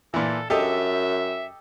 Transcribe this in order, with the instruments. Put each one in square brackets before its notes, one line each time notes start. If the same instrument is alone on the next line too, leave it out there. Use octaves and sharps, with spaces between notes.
[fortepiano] A#2 E3 [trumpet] A4
[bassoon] F#2 [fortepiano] G4 A4 D#5 [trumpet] E5